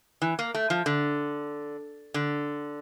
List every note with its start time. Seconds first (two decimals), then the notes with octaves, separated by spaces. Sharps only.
0.22 E3
0.39 A#3
0.54 A3
0.70 F3
0.86 D3
2.14 D3